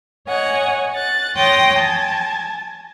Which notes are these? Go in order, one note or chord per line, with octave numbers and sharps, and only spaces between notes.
C#5 D#5 F#5 G#5
F#6 A6
C#5 G5 C6 D#6 A#6
G#5 A5